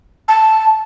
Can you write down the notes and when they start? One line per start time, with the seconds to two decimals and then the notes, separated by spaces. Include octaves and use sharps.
0.28 A5